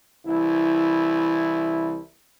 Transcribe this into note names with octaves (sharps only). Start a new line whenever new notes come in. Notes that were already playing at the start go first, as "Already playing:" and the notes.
C2 E3 E4